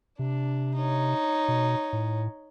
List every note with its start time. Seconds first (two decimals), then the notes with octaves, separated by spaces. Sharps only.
0.19 C3 D4
0.75 D#4 C#5
1.48 B2
1.93 A2